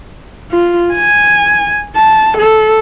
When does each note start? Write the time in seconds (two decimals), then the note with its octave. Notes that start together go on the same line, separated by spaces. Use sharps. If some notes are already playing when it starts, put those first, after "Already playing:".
0.51 F4
0.93 G#5
1.96 A5
2.38 A4